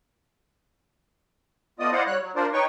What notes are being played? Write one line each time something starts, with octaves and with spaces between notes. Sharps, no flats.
A3 B3 F4 D5 D#5 D#6
E4 C5 D5 D#5 F5 F#5
G3 C#5 F#6
F#3
D4 F4 A#4 C5 D5
D#4 B4 C#5 G5 C#6